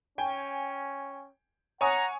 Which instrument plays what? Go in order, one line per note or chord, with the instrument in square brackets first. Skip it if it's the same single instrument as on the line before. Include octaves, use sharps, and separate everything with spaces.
[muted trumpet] C#4 [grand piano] G5 G#5
[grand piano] C#5 G#5 D#6 [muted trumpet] F#5 [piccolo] A#5